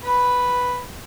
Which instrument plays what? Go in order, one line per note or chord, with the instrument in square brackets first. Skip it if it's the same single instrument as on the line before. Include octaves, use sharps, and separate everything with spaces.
[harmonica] B4 B5